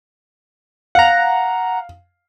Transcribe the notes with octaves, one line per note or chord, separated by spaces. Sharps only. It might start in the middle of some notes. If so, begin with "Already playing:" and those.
F5 F#5 A#5